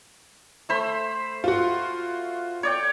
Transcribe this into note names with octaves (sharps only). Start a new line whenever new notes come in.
A3 C5 B5
F4 F#4
C#5 D5 G5